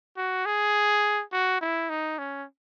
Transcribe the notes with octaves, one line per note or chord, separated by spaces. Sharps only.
F#4
G#4
F#4
E4
D#4
C#4